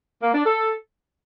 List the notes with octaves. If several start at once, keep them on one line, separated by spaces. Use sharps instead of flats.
A#3
D4
A4